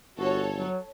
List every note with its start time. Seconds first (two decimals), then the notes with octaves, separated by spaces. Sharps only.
0.17 G1 F#4 A4 C#5
0.56 F#3